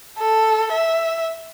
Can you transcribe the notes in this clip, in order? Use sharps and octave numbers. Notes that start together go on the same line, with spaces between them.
A4
E5